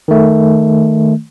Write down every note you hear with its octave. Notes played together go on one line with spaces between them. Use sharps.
D#3 A3